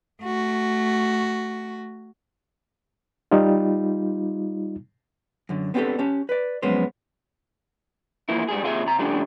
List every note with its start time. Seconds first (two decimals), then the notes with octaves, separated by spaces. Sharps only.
0.23 A3 F#4
3.31 G3 D#4 F4
5.49 F#2 D3
5.74 B3 C4 D4 D#4 G4 A4
5.99 C#4 G4 A5
6.29 B4 D5
6.62 F2 F#3 G#3 B3 C#4 C5
8.29 E3 F3 A#3 E4
8.48 G#2 G3 G#4
8.63 D#2 C3 F4 F#4 G#4 E5
8.86 C3 A#5
8.99 C#3 F3 G3 A3 D4 G4